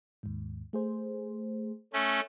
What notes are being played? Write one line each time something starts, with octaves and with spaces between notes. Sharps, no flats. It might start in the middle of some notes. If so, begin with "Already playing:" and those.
D#2 G#2
A3 G#4 C5
A3 C#4